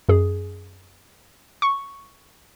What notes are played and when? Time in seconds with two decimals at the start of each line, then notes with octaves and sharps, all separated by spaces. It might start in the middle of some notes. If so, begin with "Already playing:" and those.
0.09 F#2 G#4
1.62 C#6